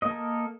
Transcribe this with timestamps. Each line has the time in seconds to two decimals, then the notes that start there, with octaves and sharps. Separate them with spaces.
0.02 D#5
0.05 A#3
0.08 A4
0.11 A#4